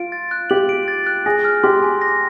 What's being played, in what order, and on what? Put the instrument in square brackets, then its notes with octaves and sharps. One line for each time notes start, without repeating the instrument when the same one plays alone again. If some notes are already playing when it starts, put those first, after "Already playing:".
Already playing: [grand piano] F4 [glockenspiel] D7
[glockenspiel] A6
F#6
[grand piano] G4 [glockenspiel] F#7
[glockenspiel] D7
A6
F#6
[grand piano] G#4 [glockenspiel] A#6
[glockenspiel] F6
[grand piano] G4 [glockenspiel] C6
[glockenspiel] G#5
A#6